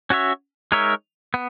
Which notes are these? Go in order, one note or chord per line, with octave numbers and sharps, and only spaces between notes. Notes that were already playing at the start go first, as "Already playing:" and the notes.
C#4 F#4 C#5 E5
G#3 D#4 A#4 C#5 E5
B3